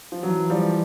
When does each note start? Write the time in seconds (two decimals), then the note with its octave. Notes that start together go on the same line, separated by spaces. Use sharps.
0.12 F3
0.22 E3 F#3
0.50 F3 G3